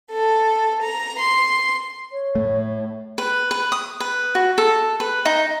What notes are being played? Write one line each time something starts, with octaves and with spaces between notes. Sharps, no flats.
A4
A#5
C6
C#5
A2 A3
B4
B4
D#6
B4
F#4
A4
B4
D#4